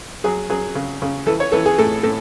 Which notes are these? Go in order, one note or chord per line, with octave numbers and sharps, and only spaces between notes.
F#3 G#4
F#3 G#4
C#3
C#3
E3 A4
C#5
E3 A4
G#4
A2 A4
A2 A4